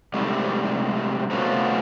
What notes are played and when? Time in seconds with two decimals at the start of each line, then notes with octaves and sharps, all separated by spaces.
0.14 G#2 C3 G3 A3
1.30 C3 A3 B3 C#4 F4 F#4